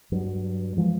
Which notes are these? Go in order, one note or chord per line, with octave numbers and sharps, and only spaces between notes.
G2 F#3
E3 F3 G#3